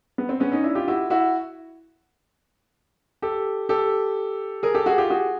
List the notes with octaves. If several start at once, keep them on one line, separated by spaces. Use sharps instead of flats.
B3
C4
B3 C#4
C#4 D#4
D4 E4
F4 G4
E4 F#4
E4 F#4
G4 A4
G4 A4
G#4 A#4
G4 A4
F#4 G#4
F4 G4
F#4 G#4